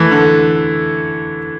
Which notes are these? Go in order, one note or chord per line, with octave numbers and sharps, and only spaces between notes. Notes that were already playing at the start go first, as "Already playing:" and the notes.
Already playing: E3 A3
D3